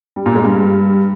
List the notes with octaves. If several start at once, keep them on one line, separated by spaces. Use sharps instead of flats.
G3
A#2
G#3
G2